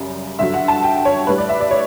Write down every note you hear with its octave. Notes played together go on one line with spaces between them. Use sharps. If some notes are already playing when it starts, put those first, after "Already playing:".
Already playing: F#2 C#3 G3
G2 D3 F#3 E5
F#5
A5
G5
C#5
A2 G3 B4
D5
E5
D5
C#5